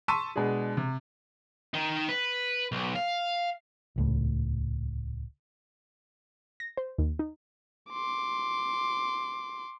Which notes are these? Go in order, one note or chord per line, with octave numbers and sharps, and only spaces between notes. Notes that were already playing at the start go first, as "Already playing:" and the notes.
A5 C6 C#6 E6 B6 D#7
B2 G#3 D4 G#4
C3
D#3 D#4
B4
B1
F5
D#1 C#2 A2
A#6
C5
D#2
D#4
C6 D6